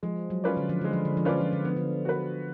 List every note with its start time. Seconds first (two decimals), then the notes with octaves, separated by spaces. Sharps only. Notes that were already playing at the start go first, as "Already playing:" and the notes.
0.03 F3 G#3
0.30 F#3
0.44 C#4 F4 B4 D5
0.57 D3
0.69 F3
0.81 D3 G#3
0.93 F3
1.05 D3
1.17 F3
1.25 D3 C#4 F4 B4 D5
1.41 F3
1.53 D3
1.65 F3 B3
1.76 D3
2.05 F#4 B4